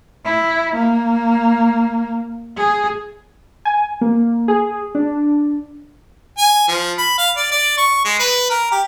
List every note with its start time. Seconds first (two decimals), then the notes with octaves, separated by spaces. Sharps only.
0.25 E4
0.75 A#3
2.57 G#4
3.65 G#5
4.01 A#3
4.48 G#4
4.95 D4
6.38 G#5
6.68 F3
6.98 B5
7.18 F5
7.37 D5
7.51 D5
7.78 C#6
8.05 G#3
8.19 B4
8.50 A#4
8.71 G4